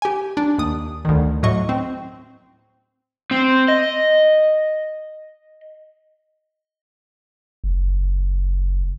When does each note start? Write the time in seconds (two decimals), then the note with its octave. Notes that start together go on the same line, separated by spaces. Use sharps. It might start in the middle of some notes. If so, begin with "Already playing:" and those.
0.02 G4 G#5
0.37 D4
0.58 D#2 D#6
1.05 D2 D#3
1.43 A2 F#3 D#5 C#6
1.69 C4
3.31 C4
3.68 D#5
7.64 F#1